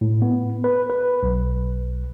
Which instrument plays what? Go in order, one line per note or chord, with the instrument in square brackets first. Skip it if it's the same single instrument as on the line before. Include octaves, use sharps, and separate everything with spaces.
[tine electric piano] A2
B3
B4
B4
B1